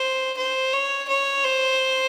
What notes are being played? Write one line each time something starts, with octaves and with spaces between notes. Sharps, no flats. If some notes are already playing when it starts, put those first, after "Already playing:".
Already playing: C5
C5
C#5
C#5
C5